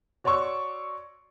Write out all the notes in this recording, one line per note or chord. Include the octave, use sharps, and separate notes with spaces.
F#4 C#5 D5 C6 C#6 E6